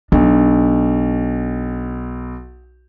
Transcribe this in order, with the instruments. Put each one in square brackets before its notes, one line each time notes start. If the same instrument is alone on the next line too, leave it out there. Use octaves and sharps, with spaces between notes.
[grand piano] B1 [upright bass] D4